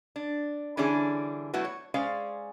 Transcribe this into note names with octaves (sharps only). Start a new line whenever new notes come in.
D4
D3 E3 G3 C#4 D4 G#4
F#3 A3 B3 E4 F#4 B4
C#5
G#3 C#4 C5 D5 F5